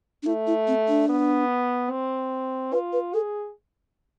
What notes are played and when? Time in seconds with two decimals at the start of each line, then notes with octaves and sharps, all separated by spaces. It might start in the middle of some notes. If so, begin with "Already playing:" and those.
0.23 D4
0.26 A3 E4
0.47 E4
0.67 C4
0.88 D4
1.09 B3
1.90 C4
2.72 F4 B4
2.93 B4
3.14 G#4 A4